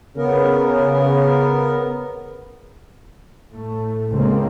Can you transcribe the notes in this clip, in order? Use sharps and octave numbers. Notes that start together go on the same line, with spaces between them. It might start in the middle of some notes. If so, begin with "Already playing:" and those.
C#3 B3 A#4
A2 A3
C#2 C#3 A#3 C4